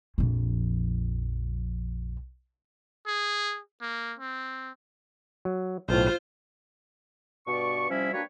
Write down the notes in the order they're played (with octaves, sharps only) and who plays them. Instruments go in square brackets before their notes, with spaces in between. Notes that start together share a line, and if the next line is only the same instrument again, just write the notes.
[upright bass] A#1 F2
[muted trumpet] G#4
A#3
C4
[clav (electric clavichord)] F#3
[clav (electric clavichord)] B1 A2 [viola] F4 C5
[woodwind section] G2 B2 D5 C#6
C3 F3 G3 C#4 E4 B5
G3 A#3 D4 F#4 B4 C#5